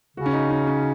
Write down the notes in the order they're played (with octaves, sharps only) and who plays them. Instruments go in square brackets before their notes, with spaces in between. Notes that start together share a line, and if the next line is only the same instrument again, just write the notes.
[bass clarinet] C#3 [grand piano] F#4
[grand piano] C#4
D#4
C#4
C#4